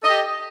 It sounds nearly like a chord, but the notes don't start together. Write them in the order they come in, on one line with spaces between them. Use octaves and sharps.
A4 D#5 G4